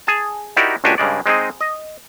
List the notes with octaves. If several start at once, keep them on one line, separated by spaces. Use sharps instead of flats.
G#4 G#5 A5
D#4 E4 F#4 G4 A#4 D5
C#2 A#2 D4 F#4 G4 G#5
G2 C#3 G#3 D5
G#3 C4 D#4 G#4 D#5
D#5